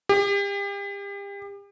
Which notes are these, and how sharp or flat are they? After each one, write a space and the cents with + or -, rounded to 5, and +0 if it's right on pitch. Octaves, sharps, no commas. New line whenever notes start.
G4 +35